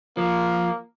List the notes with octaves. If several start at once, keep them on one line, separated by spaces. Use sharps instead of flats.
F3 A#3